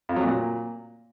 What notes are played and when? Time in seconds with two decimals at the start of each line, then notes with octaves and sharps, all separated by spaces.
0.09 F2
0.16 F#3
0.23 A#2